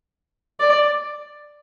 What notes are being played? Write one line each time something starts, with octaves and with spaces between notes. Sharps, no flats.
D5